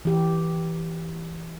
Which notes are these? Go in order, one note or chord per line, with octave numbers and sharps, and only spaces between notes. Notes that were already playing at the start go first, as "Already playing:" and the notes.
E3 G4